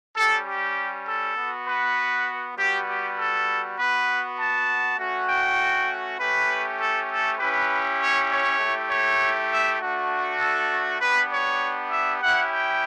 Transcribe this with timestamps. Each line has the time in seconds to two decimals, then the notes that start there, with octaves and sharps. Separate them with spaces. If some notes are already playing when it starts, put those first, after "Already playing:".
0.15 G3 C#4 G4 A4
0.46 G4
1.06 A4
1.36 B3 F#4
1.67 B4
2.57 G3 B3 F#4 G4
2.87 G4
3.17 A4
3.77 B3 F#4 B4
4.38 A5
4.98 A3 C#4 F#4
5.28 G5
6.18 A3 C#4 G4 B4
6.79 A4
7.09 A4
7.39 C#4 E4 G4 B4
7.99 C#5
8.29 C#5
8.59 A3 E4 G4
8.89 C#5
9.50 E5
9.80 A3 D4 F#4
10.40 A4
11.00 B3 D4 G4 B4
11.31 C#5
11.91 E5
12.21 C#4 E4 G4 F#5
12.51 G5